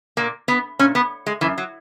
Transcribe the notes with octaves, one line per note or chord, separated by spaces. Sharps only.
A#2 A#3
B3
A#2 C#4
B3
G#3
F#2 E3
F#3